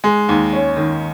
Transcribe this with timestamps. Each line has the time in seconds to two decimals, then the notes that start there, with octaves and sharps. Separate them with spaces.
0.04 G#3
0.29 D#2
0.53 C#4
0.77 D#3